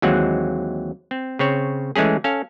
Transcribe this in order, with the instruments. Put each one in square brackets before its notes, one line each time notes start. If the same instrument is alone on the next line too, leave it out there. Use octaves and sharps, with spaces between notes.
[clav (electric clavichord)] D#2 E3 F#3 G#3 C4 F#5
C4
C#3 C4 C#5
E3 G#3 A3 C#4 G#4
C#4 A4 F5